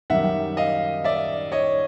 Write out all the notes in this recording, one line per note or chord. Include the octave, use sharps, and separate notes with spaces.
F#2 D#3 G3 E5 F#5
D#5 F5
D5 E5
C#5 D#5